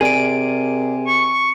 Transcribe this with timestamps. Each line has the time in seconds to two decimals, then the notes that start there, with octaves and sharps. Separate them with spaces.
0.01 C3 G#4 A#4 D5 G#5 D7
1.07 C#6